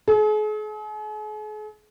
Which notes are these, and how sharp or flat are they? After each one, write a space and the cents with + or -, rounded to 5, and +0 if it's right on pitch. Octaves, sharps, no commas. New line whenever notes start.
G#4 +45